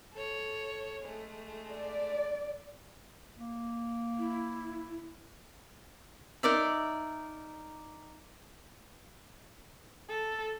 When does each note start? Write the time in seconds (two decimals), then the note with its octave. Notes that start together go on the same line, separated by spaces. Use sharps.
0.13 A4 C#5
1.03 G#3 A3
1.74 D5
3.37 A#3
4.19 E4
6.43 D#4 A#4 D5 E5
10.09 A4